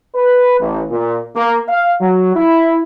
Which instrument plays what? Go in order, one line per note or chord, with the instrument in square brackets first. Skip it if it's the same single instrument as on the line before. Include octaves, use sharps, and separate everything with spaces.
[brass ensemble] B4
A1
A#2
A#3
F5
F#3
E4